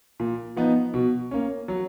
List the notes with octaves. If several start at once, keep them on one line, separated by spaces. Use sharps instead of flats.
A#2
F3 B3 D#4
B2
A#3 C#4
F#3